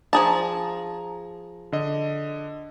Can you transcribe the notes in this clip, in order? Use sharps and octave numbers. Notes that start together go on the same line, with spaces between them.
F3 G#4 A5 A#5
D3 D#5